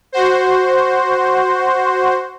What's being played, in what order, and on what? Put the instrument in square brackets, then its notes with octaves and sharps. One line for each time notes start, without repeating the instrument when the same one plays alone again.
[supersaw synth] F#4 C5